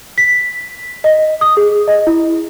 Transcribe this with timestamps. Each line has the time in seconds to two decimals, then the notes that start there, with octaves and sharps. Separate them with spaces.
0.18 B6
1.04 D#5
1.41 D#6
1.57 G#4
1.88 D#5
2.07 E4